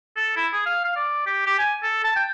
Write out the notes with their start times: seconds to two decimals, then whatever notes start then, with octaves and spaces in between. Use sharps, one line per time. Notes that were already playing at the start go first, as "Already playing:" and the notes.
0.16 A4
0.36 E4
0.53 G#4
0.66 F5
0.85 F5
0.96 D5
1.26 G4
1.46 G4
1.58 G#5
1.83 A4
2.04 A5
2.16 G5